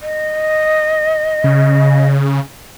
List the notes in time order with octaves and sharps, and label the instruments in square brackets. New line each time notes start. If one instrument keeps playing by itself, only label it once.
[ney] D#5
[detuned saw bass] C#3